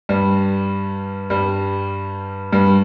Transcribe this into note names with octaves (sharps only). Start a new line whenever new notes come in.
G2 G3
G2 G3
G2 G3